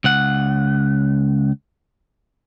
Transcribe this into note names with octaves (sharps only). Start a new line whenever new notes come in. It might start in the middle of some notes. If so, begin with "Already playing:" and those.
C#2 F#5